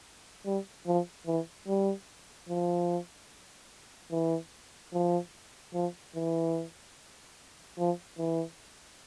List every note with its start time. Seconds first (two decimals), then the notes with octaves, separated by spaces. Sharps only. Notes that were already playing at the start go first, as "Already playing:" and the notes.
0.46 G3
0.87 F3
1.27 E3
1.68 G3
2.49 F3
4.12 E3
4.93 F3
5.74 F3
6.15 E3
7.78 F3
8.18 E3